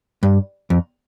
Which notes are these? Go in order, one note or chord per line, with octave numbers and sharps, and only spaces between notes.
G2
F2